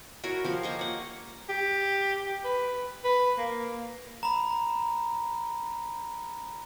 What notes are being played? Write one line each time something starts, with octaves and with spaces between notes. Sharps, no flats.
E4 F#4 A#4 C#5
F3 G4 F5
A#3 D#5 C#6
C#5 F#5
G4
B4
B4
A#3
A#5 B5